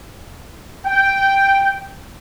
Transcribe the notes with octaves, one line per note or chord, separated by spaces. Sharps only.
G5